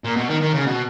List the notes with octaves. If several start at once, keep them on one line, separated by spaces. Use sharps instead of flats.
A#2
B2
D#3
D#3
C#3
B2